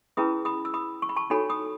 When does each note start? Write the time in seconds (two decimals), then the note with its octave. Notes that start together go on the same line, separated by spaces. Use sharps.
0.17 C#4 E4 G#4 B4 B5 D#6
0.45 B5 D#6
0.65 E6
0.74 B5 D#6
1.02 C#6
1.09 B5
1.16 A5 C#6
1.30 D#4 F#4 A4 C#5 G#5 B5
1.49 B5 D#6